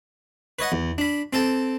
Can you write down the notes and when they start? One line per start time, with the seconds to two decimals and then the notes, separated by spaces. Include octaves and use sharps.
0.59 B4 C#5 D#5 F#5
0.72 E2
0.98 D4 B5
1.33 C4 A4 G5 A5